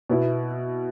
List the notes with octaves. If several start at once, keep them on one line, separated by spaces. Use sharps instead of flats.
B2 B3 E4